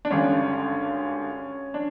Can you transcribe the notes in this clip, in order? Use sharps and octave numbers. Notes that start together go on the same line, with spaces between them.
D4
G#1 G2 D3 C#4
D4